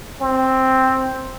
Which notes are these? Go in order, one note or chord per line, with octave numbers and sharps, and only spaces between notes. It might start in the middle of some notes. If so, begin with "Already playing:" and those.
C4